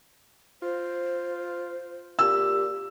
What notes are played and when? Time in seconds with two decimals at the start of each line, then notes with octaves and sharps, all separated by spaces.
0.62 F4 C5
2.19 A#2 G4 E6